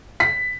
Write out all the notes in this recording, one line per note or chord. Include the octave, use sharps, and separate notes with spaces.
B6